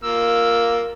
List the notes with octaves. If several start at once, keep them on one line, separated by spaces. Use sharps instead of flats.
A#3 F4 E6